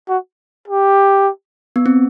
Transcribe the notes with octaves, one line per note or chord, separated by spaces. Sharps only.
F#4
G4
B3
C4